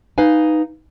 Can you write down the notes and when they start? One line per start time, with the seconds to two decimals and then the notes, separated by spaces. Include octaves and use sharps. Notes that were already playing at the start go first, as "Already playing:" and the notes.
0.18 D#4 B4 F5 G#5